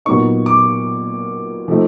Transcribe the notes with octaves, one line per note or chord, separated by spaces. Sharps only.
A#2 F#3 B3 D#4 C#6
D6
F3 A3 C4 D#4